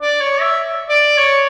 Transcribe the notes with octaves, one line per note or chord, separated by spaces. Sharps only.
D5
C#5
E5
D5
C#5